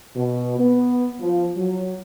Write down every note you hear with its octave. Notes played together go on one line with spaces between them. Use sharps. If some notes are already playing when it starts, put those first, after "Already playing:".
B2
B3
F3
F#3